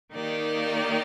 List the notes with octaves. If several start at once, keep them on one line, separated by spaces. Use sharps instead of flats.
D#3 A#3 D#4 G4 D5